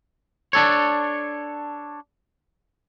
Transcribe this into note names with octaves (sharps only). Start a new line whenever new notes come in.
D4 A4 C#5